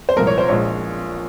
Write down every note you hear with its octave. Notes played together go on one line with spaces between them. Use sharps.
C5
C2 A#2 F3 G#3 A#4
C#5
C5
A#1 A#2 G#3 C#5